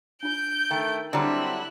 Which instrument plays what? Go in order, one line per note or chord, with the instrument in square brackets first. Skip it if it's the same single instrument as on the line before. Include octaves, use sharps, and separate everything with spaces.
[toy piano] D4 F4 [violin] G6 D7
[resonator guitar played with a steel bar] D#3 [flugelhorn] A3 [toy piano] G5 E6
[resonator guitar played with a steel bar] D3 F#3 G3 [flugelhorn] C4 [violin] E4 F#6 [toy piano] D5 A#5